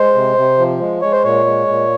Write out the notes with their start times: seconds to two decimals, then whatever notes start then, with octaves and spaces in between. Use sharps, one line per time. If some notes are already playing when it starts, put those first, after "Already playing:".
Already playing: G#3 C5
0.14 C3
0.37 C3
0.58 F3
0.80 G#3
1.02 G#3 C#5
1.12 C5
1.24 A#2 C#5
1.46 G#3
1.67 A#2